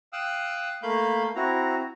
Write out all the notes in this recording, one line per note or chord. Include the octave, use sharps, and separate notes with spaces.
F5 G5 D#6 E6 F#6
A3 A#3 F5 B5 G6
C4 E4 F#4 A#5